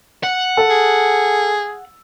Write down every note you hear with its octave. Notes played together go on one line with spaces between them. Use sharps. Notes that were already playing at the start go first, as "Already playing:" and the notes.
F#5
A4
G#4